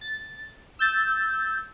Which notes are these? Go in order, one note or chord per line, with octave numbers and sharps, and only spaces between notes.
A6
E6 G6 A6